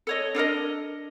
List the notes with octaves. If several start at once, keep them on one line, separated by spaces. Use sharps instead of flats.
A4 C#5 D#5
D4 A4 A#4 D#5